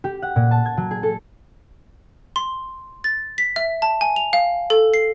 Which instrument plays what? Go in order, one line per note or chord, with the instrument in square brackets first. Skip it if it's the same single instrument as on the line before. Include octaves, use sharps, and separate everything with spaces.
[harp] G4
F#5
A#2
A5
G#6
F#3
G#4
A4
[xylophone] C6
A6
B6
E5
A5
G#5
F7
F5
A4
C7